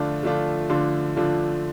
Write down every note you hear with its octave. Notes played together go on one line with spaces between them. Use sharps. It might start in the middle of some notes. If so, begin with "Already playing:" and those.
Already playing: D3 F3 A3 D4 F4
D3 F3 A3 D4 F4
D3 F3 A3 D4 F4 C6
D3 F3 A3 D4 F4